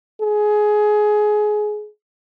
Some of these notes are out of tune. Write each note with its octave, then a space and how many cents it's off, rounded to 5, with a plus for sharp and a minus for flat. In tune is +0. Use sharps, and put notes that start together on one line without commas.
G#4 +20